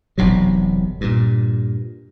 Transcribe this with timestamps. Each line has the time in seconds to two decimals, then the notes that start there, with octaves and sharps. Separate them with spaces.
0.18 E1 B1 C3 F#3
1.01 G2 A#2